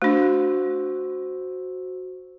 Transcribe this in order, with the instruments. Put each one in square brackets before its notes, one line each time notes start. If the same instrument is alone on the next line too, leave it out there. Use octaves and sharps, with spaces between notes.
[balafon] A3 D4 [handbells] F#4 C5 E6